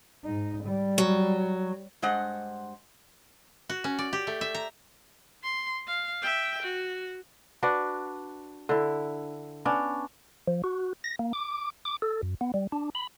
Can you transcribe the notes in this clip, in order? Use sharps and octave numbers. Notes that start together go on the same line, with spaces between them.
G#2 D#4
G3
F#3
G2 G#3 C5 D#5 F#5
F#4
C#4
D5
G4
A3
E5
A#5
C6
F5
E5 G5
F#4
D4 F#4 B4 D5
D3 E4
B3 C#4 D4
F3
F#4
A#6
A#3
D6
D6
A4
F#2
B3
G3
D4
B5